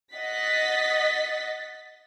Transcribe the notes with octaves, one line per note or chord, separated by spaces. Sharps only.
D#5 F#5 A6 B6